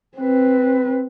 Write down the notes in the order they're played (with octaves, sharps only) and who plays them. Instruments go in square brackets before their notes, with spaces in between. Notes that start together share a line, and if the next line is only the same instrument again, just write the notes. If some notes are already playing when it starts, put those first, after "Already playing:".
[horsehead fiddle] C4 B4